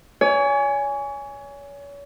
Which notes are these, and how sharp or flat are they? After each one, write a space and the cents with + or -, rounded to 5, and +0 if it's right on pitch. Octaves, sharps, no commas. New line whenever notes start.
C#5 +35 G#5 +0